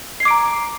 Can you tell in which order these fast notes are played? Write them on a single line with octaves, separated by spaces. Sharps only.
C7 G#6 D6 D7 A#5